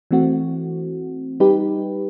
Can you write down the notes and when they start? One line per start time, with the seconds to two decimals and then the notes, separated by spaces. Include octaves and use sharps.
0.11 E3 A3 C4 F#4
1.40 G3 D#4 G4 B4